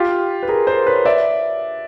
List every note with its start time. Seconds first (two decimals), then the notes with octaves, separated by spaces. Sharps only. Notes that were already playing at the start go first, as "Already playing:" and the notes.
Already playing: F4 G4
0.43 B4
0.48 G#4 A#4
0.67 A#4 C5
0.87 B4 C#5
1.05 D5 E5